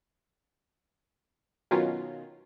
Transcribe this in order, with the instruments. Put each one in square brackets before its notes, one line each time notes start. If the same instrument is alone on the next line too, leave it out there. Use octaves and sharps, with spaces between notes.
[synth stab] B2 D#3 F#3 C#4 F4